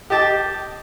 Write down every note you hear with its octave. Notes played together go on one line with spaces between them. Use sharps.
G4 D#5 A5 D6